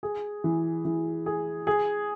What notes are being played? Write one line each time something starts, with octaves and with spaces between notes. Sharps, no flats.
G#4
E3
E3
G#4
G#4